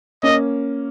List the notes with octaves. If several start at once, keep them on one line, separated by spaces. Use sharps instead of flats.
A#3 C#4 D#5